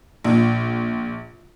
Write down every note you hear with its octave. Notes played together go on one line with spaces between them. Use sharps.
A#1